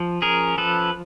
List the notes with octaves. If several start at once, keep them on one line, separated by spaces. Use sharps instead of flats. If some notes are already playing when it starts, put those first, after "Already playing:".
Already playing: F3
C#4 G#4 A#4
F3 A4 B4